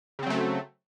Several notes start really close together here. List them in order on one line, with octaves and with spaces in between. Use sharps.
C#3 C4 F#3 A3